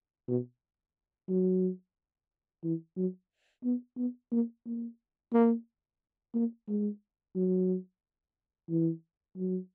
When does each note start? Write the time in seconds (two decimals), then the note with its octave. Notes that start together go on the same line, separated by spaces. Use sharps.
0.28 B2
1.28 F#3
2.64 E3
2.96 F#3
3.64 B3
3.97 B3
4.32 A#3
4.66 A#3
5.33 A#3
6.34 A#3
6.68 G#3
7.35 F#3
8.69 E3
9.37 F#3